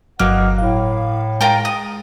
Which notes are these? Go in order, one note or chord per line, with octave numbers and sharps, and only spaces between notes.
G1 F#3 A#3 B4 D#5 F#5 F6
A2 F5
G#3 F4 A#4 G5
D#6